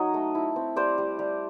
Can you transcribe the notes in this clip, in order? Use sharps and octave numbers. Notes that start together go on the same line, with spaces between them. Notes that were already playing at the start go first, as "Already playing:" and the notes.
Already playing: F#3 D#4 C#5 D#5
A3
E4
C4
G3 C5 D5
G3
G3